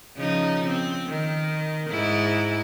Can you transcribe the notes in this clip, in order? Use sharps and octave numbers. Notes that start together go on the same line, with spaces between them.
C#3 F3 D#4
C4
D#3
G#2 E4